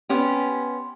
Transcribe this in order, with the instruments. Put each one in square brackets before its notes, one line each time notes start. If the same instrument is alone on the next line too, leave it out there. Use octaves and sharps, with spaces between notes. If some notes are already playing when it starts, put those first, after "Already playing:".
[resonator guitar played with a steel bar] B3 C#4 G4 [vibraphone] C6